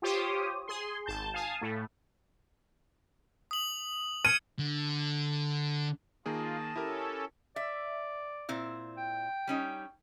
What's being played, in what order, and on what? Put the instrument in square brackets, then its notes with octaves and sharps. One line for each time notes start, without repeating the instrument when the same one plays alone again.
[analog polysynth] F4 G4 C5 C#5 D#6
G#4 C6
G#1 A5 G6
F5 G#5 A5 D#6
A2 A3
[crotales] D#6 F#7
[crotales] F6 G#6 C#7 [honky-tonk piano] D#7
[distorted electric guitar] D3
[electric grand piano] D#3 A#3 G#4 [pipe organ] F4 [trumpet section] D#5 A5
[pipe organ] C#4 A4 [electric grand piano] E4 G4 A#4
[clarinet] D5 [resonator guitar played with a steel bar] E5
[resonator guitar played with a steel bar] A#2 C4 E4
[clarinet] G5
[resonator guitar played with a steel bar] G3 C#4 D#4